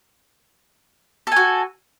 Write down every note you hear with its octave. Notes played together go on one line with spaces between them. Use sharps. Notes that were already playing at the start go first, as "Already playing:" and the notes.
F#4 A4 G#5